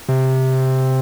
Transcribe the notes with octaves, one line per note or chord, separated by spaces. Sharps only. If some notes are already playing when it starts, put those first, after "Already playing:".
C3